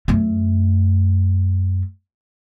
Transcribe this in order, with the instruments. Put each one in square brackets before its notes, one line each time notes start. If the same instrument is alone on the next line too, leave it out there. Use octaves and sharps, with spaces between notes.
[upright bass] F#2 A3